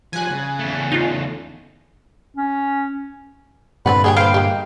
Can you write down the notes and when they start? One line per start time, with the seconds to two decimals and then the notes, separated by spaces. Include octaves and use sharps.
0.13 F3 G3 G#5 F#6
0.31 C#3
0.59 E2 A3
0.92 D#4 F4
2.37 C#4
3.86 G2 A#2 D3 C4 B4 D5 F#5
4.04 A#3 G4 G#4 G5
4.16 A#3 B4 C5 F5 G5 F6
4.34 G#3 A#3 G4